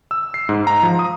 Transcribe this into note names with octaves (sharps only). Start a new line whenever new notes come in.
E6
C7
G#2
A#5
F3
D#6